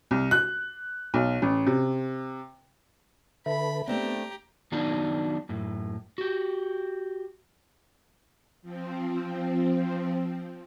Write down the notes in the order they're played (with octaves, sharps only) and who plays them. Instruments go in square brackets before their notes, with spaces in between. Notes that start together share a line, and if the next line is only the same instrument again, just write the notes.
[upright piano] C2
F#6
B1
A1
C3
[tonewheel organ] D3 A4 B4 [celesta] E5 [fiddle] B5
[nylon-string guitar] A3 C4 D4 [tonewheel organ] B3 [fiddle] G4 A#5
[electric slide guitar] D#3 F#3 B3 D4 D#4
F#2 A2
F#4 G4
[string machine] F3 C4